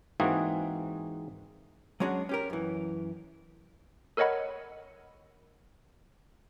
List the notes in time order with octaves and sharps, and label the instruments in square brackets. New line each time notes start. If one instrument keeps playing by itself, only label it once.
[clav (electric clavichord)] G#2 E3 A#3 C4 F#4 G#4
[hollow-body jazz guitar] F#3 G#3 C#4 D4 F#4 G#4
C#4 G4 A#4
F#2 E3
[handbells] A4 A#4 C#5 D#5 F#5 B5